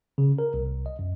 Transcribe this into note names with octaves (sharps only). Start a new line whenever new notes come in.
C#3
A#4
C2
D#5
F#2